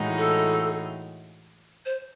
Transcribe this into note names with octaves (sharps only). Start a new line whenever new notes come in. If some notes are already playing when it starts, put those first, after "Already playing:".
Already playing: A2 E3 G#3 D#4 F#4
A4
C5